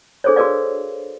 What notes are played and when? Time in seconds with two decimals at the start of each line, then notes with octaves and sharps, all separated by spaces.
0.24 D4 G#4 A4 C5 C#5
0.36 F#4 G#4 A#4 B4 D5 F5